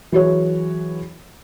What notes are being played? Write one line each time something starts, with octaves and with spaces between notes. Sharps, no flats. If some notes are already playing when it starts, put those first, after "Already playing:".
E3 F#3 E4 F#4 G#4 C#5